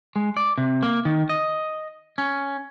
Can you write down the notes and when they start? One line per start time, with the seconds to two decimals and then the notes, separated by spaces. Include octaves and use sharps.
0.16 G#3
0.37 D5
0.58 C3
0.83 A#3
1.05 D#3
1.29 D#5
2.18 C#4